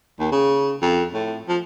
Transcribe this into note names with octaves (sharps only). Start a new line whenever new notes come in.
D#2
C#3
F2
A2
F3